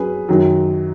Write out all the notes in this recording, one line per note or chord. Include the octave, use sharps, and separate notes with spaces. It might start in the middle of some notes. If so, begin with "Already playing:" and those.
Already playing: F#3 C#4 G#4 B4
F#2 D#3 F#3